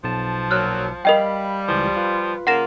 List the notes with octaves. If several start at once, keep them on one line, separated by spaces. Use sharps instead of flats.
B1 F3 A5
A#2 F#3 F6 F#6
G3 A#4 D#5 F5 G5 B5
C#2 E3 F3
F4 B4
C#3 A#3 F4 F#5 A#6 E7